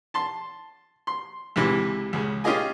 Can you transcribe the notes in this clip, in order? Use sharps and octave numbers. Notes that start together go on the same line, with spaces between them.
A5 C6
C6
C#2 C3 E3
C#2 C#3
C#4 F4 G4 G#4 D#5 G#5